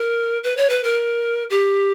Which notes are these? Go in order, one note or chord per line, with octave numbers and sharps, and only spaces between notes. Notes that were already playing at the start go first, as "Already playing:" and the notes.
Already playing: A#4
B4
C#5
B4
A#4
G4